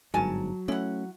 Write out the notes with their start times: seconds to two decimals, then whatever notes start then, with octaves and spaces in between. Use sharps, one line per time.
0.14 G1 G#2 F#3 A#4 G#5 A5
0.68 A3 C#4 E4 F#5